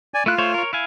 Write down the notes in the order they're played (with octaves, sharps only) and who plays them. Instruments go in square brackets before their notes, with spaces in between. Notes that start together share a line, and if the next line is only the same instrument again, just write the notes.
[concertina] D5 G#5
[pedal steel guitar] A3 E4 F#6 [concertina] F4
[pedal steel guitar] A3 C5 C#5
A#4 C#5
E4 F5 G#5